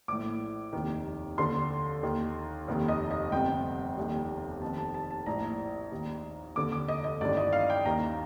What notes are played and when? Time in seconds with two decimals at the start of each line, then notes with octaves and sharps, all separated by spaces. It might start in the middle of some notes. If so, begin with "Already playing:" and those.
0.08 A#1 A2 D6
0.73 F1 D#2 D#3
1.37 D#2 D3 C6
2.03 D#2 D#3
2.68 F1 D#2 D#3
2.88 D#5
3.11 D#5
3.32 G1 F2 C3 G5
3.97 F1 D#2 D#3
4.62 F1 F2 D#3 A5
4.78 A5
4.94 A5
5.10 A5
5.26 A#1 A2 A#5
5.92 D#2 D#3
6.56 F1 D#2 D3 D6
6.72 D6
6.88 D#5
7.04 D#5
7.21 A1 G2 D#3 D5
7.37 D#5
7.53 F5
7.70 G5
7.85 D#2 D#3 A#5